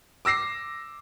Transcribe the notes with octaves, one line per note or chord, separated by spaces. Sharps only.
D6 E6 A#6 C7